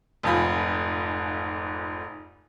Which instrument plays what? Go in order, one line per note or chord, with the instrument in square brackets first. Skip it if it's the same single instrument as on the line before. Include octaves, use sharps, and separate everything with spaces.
[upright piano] F1 F2 G#2 F4 G#5 B5